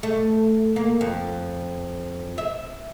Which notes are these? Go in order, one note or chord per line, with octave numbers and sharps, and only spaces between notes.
A3
A#3
F2
E5